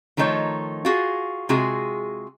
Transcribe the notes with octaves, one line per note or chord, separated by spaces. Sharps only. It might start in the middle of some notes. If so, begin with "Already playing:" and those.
D#3 F3 A3 D#4 F#4 C#5
F4 F#4 G#4
C3 G#3 F4 F#4 G#4